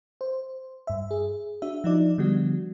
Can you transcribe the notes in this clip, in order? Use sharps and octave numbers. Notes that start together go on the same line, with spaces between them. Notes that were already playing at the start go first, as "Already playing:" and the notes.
C5
G2 E5
G#4
D4 F#4 E5
F3 D#4 D5
D3 F3 G3 B3 F#4